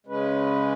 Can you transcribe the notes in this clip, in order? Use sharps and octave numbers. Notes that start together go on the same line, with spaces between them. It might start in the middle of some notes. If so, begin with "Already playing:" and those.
C#3 G#3 C#4 B4